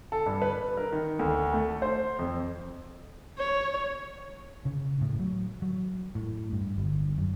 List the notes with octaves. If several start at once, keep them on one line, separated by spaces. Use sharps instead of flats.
A4
G2
B4
A#4
D#3
D2
A3
C5
F2
C#5
C#3
A2
F#3
F#3
A2
G2
G1
F#2